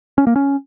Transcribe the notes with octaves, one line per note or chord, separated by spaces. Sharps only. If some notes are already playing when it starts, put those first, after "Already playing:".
C#4
A#3
C#4